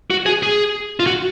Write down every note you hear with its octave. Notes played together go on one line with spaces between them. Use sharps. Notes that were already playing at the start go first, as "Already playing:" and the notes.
F#4
G#4
G#4
F4
F#4